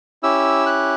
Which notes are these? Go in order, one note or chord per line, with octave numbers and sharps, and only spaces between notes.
C#4 E4 G4 E6
F#6